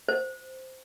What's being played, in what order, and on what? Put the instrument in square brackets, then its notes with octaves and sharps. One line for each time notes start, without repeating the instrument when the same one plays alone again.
[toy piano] C5